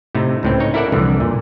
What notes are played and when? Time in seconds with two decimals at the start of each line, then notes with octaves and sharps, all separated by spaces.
0.15 A2 C3 A3 D#4
0.43 C#2 A2 C4
0.60 D#4 C#5
0.74 E4 A4 A#4 D5 E5 F#5
0.92 C2 F2 D3 E3
1.20 A#2